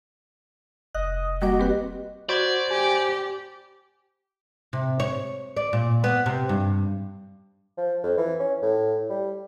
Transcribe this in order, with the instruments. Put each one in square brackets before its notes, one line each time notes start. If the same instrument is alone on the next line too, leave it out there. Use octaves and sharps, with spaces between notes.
[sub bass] F1 [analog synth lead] D#5 [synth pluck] F#6
[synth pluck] G3 A#3 D6 [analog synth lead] F#4 [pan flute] D#5
[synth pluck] C4 B4 F#6 [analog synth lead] G4
[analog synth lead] F#4 [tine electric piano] C5 B5 G#6 [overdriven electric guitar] D5
[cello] G4 [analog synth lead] G#5
[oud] C3
C#5
D5
A#2
B3
C3
G2
[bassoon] F3
F2
E3
C#4
A2
G3